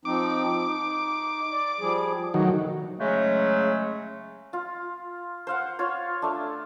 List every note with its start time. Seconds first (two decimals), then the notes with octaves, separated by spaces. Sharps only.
0.05 F3 C4 D#4 D6
0.66 D#4
1.52 D5
1.80 F3 G3 G#4
2.34 D#3 F#3 A3
2.98 C#3 F#3 G#3 A3 C#4
4.53 F4
5.47 C5 F5 F#5
5.79 F4 C#5
6.22 A3 D4